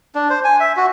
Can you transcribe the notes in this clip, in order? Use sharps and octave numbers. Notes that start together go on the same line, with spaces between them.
D4
C5
G#5
E5
F#4